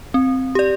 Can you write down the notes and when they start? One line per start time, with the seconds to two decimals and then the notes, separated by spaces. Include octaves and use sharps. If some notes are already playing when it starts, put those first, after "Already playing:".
0.14 C4
0.55 G4 D5